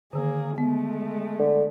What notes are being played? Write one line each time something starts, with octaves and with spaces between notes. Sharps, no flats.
D3 D#3 A#3 G#4
G#3 A3 B3
D3